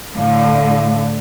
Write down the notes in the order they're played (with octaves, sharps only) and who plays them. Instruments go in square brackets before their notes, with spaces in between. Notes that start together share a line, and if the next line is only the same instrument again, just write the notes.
[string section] A2 D3 [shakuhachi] F5